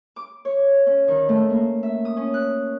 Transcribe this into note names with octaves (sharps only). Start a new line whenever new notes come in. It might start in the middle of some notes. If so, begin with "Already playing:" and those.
D6
C#5
C#4
D#3
A3
A#3
E5
D#6
C#4
F#6